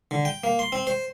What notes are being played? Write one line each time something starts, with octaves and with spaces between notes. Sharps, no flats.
D3
G5
A#3
C6
C4
C5